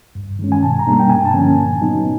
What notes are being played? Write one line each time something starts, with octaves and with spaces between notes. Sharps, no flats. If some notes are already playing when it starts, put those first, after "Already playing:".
G2
D#3 G#3 C#4
G#5
B2 A5
A#5
G3 A#3 D4
G5
G2 G#5
A5
D3 F3 A#3 C#4
G#5
A#2
F#3 B3 D#4